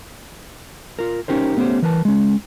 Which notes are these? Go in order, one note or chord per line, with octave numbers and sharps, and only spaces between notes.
F4 A#4
C#4 D#4 G4 A#4 C5
A3 B3 C#4 G4 C5
E3 A#4 B4 G5 A5
G#3 C#4